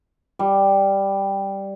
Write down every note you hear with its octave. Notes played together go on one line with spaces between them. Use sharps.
G3